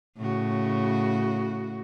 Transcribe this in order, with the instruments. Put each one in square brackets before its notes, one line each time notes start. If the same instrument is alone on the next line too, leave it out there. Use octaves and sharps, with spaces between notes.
[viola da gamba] A2 C#3 F#4